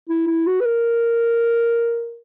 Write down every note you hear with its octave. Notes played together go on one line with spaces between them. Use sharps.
E4
E4
F#4
B4
A#4